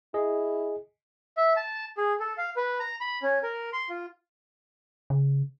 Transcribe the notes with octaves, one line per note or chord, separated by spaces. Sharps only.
E4 G#4 D#5
E5
A5
G#4
A4
F5
B4
A#5
B5
C#4
A#4
C6
F4
C#3